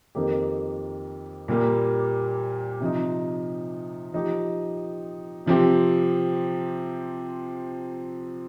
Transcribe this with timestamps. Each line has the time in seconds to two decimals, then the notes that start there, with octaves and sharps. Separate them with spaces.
0.15 F2 D#3 A#3 G4
1.48 A#2 G3 A#3 G4
2.81 C3 F3 D#4
4.14 F3 D#4 G4
5.46 C3 F3 C4 G4